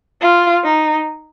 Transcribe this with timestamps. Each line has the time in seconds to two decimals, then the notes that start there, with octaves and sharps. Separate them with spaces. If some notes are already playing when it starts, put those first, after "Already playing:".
0.21 F4
0.64 D#4